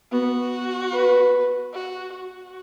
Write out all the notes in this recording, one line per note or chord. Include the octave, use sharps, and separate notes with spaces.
B3 F#4
B4
F#4
F#4